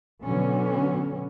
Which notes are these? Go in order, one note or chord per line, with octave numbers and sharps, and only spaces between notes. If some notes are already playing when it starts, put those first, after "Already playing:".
B2 D3 F#3 B3 C#4